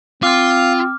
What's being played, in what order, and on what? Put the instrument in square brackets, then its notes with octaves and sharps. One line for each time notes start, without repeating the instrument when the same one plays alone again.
[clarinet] C4 [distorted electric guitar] F4 [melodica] F5 [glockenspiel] D6 F6